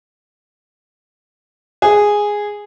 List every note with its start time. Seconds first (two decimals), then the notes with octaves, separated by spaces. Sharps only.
1.82 G#4